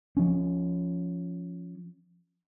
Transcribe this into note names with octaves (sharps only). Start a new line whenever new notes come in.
F3 C#4